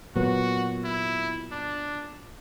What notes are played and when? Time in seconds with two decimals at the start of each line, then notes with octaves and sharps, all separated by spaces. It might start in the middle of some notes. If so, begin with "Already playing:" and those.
0.16 A#2 F#3 B3 F#4
0.84 E4
1.52 D4